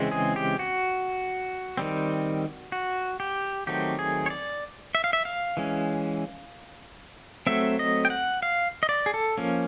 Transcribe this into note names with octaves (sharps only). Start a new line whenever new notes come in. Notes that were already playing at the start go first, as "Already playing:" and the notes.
Already playing: C#3 E3 G#3 C4
G#4
G4
F#4
D#3 G3 C4
F#4
G4
D#3 F#3 A3 C4 G4
G#4
C#5
D5
E5
F5
E5
F5
E3 G#3 C#4
F#3 A3 C4 E5
D#5
G5
F#5
F5
D#5
D5
G#4
A4
F3 A#3 C#4